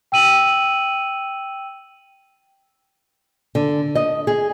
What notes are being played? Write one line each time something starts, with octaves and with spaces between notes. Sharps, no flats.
G5 E6 D#7 F#7
D3
D#5
G#4